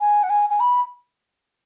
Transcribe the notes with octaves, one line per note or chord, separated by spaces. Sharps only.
G#5
F#5
G#5
G#5
B5